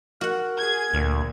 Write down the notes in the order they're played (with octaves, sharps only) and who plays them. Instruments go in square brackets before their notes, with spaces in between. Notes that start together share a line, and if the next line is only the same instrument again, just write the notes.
[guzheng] F#4 F#5 [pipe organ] A#4
[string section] G#4 G#6
[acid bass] D2 [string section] A#2